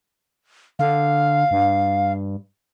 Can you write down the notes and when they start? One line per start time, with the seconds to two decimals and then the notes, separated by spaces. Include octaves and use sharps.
0.79 D3 F5
1.51 G2